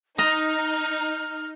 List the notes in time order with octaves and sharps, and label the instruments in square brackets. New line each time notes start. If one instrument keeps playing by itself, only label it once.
[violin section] D#4 [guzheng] D#5 A#5 [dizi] F6